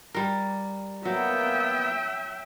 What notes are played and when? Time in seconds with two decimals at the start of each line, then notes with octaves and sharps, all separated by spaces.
0.14 G3 A#4
1.05 F#3 A#3 B3 E5 G5